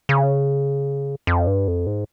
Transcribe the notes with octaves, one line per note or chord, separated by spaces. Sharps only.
C#3
F2
G2
F2
G#2